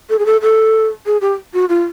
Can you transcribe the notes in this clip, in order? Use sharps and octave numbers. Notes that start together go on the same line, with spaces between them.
A4
G#4
A4
A4
G#4
G4
F#4
F4